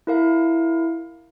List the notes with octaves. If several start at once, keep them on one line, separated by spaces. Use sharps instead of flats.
E4 A#4 F5